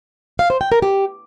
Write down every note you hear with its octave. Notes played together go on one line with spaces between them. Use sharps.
F5
C5
G5
A#4
G4